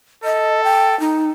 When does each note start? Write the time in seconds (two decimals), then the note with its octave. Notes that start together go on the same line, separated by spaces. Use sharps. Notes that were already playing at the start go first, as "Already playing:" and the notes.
0.24 A4 D#5
0.64 G5
1.00 D#4